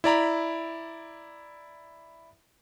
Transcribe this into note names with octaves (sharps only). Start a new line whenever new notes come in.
E4 D5 A#5 B5